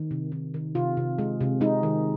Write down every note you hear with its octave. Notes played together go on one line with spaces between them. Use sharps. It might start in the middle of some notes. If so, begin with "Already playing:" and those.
Already playing: D#3
C3
D#3
D#3
C3 F4
C3
G#3
C3
G#3 D#4
D#3